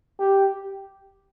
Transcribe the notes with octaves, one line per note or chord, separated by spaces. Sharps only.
G4